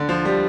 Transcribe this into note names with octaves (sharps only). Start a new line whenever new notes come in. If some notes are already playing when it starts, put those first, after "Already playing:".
Already playing: D3
F3
G3